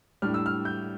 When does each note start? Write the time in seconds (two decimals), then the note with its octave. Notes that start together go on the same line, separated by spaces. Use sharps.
0.22 A2 G3 D4 F6
0.34 E6
0.46 F6
0.65 G6